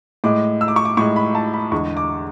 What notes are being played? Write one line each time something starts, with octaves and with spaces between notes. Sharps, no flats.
A2 G#3 D6
E6
D6
C#6
D6
A2 G#3 C#6
B5
A5
B5
E2 D3 G#3 C#6
D6